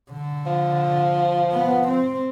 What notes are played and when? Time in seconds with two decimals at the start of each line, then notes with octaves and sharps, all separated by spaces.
0.11 D3
0.46 F3
1.52 B3
1.88 C4